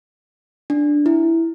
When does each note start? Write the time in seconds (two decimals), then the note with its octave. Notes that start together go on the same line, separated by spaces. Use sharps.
0.70 D4
1.06 E4